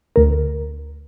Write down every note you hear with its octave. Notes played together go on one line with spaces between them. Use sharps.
D2 A#4